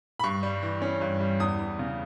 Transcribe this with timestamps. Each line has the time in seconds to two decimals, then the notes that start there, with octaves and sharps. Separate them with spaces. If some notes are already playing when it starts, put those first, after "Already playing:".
0.19 B5
0.24 G2 C#6
0.43 G3
0.62 E3
0.82 C#4
1.01 G2
1.20 G3
1.40 E2 D#6
1.59 E3
1.79 C#3